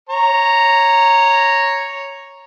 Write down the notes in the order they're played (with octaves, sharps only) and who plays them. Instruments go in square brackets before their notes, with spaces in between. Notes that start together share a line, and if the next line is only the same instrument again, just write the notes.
[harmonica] C#5 A#5